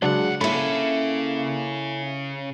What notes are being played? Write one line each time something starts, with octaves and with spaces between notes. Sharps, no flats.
C#2 C#3 F#3 G#3 D4 F#5
C#3 A#3 C#4 E4 A4 B5